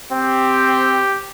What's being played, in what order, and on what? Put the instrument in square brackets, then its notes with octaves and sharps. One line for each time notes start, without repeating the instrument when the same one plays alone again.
[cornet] C4 [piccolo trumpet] G4